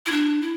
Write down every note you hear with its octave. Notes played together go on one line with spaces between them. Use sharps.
E4
D4
E4